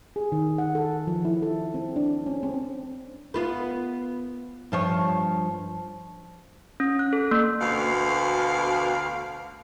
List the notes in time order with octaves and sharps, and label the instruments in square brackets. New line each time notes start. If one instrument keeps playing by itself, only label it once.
[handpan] G#4
D#3
F#5
A4
F3
E4
A4
C4
D4
C#4
C4
[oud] B3 F4 B4
G2 F3 C#5
[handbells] C#4
F#6
A4
A#3
[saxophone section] D2 B2 F5